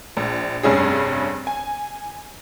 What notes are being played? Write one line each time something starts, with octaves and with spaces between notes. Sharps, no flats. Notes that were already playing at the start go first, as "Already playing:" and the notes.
A#1
F1 G2 C#4 G#4
G#5